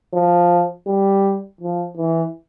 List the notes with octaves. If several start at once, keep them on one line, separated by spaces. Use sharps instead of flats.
F3
G3
F3
E3